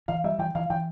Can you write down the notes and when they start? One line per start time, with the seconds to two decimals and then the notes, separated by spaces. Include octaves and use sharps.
0.08 E3 F5
0.24 G3 E5
0.39 E3 G5
0.55 E3 F5
0.70 E3 G5